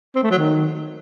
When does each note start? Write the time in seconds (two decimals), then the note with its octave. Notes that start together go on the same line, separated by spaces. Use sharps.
0.15 C4
0.23 A3
0.31 F#3
0.38 D#3